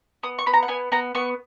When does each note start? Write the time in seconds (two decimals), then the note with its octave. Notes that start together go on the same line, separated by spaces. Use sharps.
0.23 B3 D#6
0.39 C#6
0.46 B3 B5
0.54 A#5
0.63 F#5
0.68 B3 G#5
0.92 B3 A#5
1.15 B3 C#6